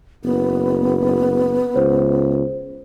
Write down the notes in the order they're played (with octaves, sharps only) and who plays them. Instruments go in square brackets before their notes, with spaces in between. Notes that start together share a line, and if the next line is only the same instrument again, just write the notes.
[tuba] F#1 [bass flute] B3
[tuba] C#2 [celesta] C5